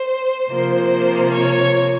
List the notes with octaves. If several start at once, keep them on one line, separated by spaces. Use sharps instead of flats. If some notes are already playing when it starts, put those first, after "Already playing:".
Already playing: C5
C3 F3 A#3 C5
C#5